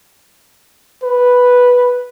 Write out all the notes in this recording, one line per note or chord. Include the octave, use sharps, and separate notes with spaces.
B4